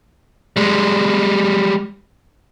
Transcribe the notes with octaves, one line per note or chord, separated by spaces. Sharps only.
G3 G#3